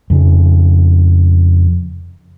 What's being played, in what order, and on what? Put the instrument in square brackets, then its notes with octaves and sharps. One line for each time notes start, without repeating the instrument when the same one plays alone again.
[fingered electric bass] F2 C#3